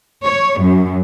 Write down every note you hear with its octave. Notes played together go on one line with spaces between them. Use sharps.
C#5
F#2